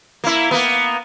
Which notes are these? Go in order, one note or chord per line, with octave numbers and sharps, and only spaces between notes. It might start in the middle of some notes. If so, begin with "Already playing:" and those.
A#3 E4
A#3 B3